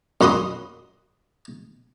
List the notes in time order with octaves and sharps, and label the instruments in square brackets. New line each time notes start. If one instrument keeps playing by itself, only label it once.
[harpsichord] F#2 F#4 B5 C6 D#6